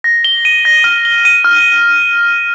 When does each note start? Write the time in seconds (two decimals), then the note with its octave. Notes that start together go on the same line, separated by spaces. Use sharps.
0.04 A#6
0.24 G7
0.45 D#7
0.65 A#6
0.84 F6
1.05 G7
1.25 D#7
1.44 F6